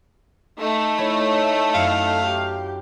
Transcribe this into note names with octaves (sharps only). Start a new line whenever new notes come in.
A3 D#4
E4 C#5 B5
F#2 E4 F5 C#7
G4